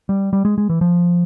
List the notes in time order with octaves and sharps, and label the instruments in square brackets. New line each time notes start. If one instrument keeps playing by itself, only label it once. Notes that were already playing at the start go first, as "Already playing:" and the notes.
[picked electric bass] G3
G3
G#3
G#3
E3
F3